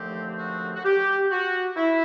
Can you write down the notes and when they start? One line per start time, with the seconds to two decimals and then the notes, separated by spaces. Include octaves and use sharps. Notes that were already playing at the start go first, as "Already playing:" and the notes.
Already playing: D#2 D3 F3 A3 C4 G4
0.39 F#4
0.75 F#4
0.85 G4
1.31 F#4
1.77 E4